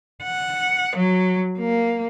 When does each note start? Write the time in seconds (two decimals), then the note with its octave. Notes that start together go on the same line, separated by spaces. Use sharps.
0.23 F#5
0.96 F#3
1.59 A#3